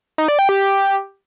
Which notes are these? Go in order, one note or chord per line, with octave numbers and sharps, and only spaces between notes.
D#4
D5
G5
G4